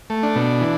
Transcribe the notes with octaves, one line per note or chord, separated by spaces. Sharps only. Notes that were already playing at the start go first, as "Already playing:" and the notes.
A3
D4
B2
E3